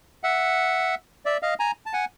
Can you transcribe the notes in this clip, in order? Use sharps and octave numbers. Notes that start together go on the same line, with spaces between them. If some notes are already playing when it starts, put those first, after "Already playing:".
E5 F#5
D5 E5
D#5 F5
G#5 A#5
A5
F#5 G#5